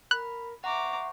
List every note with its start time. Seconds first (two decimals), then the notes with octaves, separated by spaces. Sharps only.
0.11 A#4 B5 F#6
0.64 C5 E5 F#5 A#5 C#6 D6